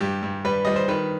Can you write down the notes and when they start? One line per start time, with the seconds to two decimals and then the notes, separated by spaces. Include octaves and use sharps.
0.01 G2 G4
0.23 G2
0.45 G3 B4
0.65 G3 D#5
0.76 C5
0.88 D#3 B4